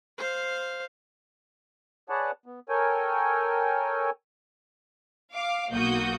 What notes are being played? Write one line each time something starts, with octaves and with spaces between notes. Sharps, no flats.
C5 F5
G#4 B4 C#5 D5 F#5 A5
B3
A4 A#4 C#5 G5 G#5
F5 D6
B1 A#3 F#4 D#6 G6